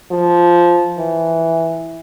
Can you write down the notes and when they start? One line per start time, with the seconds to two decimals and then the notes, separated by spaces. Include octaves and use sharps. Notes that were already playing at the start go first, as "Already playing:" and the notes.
0.12 F3
0.99 E3